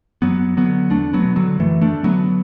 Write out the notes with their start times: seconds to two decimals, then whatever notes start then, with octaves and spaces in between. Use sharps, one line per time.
0.22 F#2 F#3 B3
0.57 D3 F#3 B3
0.91 E2 A3 D4
1.13 F#3 B3
1.25 B2
1.36 D3 F#3
1.59 F#2 E3 A3
1.81 A3 D4
1.93 D3
2.04 F#3 B3